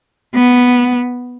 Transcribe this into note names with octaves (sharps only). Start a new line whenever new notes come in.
B3